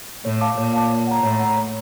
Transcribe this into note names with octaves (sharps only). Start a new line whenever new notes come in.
A2 C#5
F5 A5 D6
A#2 C#5
F5 A5 D6
C#5
F#5 A#5
A2 C#5
F#5 A#5
C#5